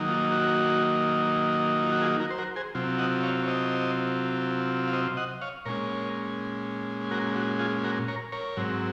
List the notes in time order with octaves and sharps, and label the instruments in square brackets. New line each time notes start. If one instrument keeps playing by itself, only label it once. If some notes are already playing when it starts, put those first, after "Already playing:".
Already playing: [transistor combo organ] D#3 F#3 A#3 D#4
F4
F#4
F4
F#4
F4 G#4
F#4 A#4
C5
F#4 A#4
G#4 C5
C3 F#3 C4 F4
D#5 F#5
C#5 F5
C#5
C5 D#5
F5
C5 D#5
D#5 F#5
C#5 F5
A#2 G#3 C#4 A#4 C#5
F#4 A#4
F#4
F4 G#4
F#4 A#4
A#4 C#5
A#4 C#5
G#2 F#3 C4